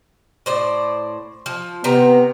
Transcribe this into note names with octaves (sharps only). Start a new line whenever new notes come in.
A2 C5 D5
F3
C3 D#3 B3 A#5